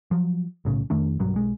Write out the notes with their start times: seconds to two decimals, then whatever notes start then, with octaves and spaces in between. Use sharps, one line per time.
0.11 F3 F#3
0.65 B1 A2 C#3
0.90 F2 D#3 A3 D4
1.19 B1 G2 F#3
1.34 B1 G#3